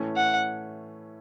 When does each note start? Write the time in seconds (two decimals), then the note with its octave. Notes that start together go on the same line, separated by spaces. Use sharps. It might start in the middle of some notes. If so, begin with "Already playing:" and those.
Already playing: A2 E3 A3 C#4
0.17 F#5